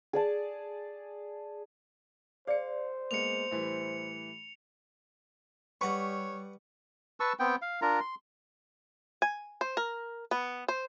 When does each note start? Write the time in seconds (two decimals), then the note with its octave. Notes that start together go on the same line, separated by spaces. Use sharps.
0.13 G#4 D5 A5
2.47 G#4 C5 D5 F5 C#7
3.11 G#3 A#3 B3 C#7 F7
3.51 A2 E3 G3
5.81 G3 B4 C#5 F#5 A#5 C#6
7.20 B4 A5 C#6 E6
7.39 B3 C4 G5
7.62 F5
7.82 D4 F4 A#4 A#5
8.00 C6
9.22 G#5
9.61 C5
9.77 A#4
10.31 B3
10.68 C5